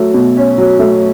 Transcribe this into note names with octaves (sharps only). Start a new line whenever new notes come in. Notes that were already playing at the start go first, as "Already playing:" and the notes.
Already playing: F#3 A3
B2
C#4
F#3
A3